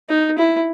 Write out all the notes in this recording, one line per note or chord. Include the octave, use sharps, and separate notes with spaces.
D#4
E4